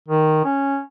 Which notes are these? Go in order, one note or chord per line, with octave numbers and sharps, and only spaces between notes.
D#3
C#4